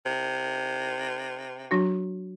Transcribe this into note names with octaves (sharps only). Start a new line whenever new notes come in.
C3
F#3 D4 F#4